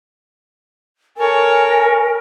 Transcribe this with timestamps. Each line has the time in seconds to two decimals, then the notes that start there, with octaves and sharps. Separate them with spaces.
1.17 A4 A#4 C#5 G#5